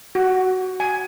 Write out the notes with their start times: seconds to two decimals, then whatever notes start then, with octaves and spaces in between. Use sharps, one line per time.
0.15 F#4
0.80 G#5